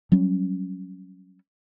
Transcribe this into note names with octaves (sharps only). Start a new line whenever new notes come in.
F#3 G3 C#4